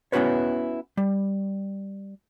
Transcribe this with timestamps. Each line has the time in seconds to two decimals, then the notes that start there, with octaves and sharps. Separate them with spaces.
0.12 B3 C#4 E4 F#4 B4 C#5
0.97 G3